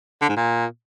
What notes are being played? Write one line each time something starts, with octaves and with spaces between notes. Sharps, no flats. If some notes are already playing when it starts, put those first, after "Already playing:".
D3
G#2
A#2